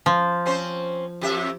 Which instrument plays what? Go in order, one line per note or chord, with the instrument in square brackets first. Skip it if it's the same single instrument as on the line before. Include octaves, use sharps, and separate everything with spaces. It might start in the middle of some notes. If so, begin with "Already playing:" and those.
[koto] F3
[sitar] C4 C#4 C5
F2 G4 E5